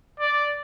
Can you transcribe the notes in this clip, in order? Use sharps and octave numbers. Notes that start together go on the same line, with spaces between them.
D5